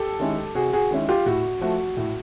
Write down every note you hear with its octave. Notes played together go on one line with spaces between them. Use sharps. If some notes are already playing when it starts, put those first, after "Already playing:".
Already playing: G4 A4
D#3 G#3 C#4 E4
C3 F#4 G#4
F#4 G#4
D#3 G#3 C#4 E4
F4 G4
A2 F#4
F3 A3 F#4
A2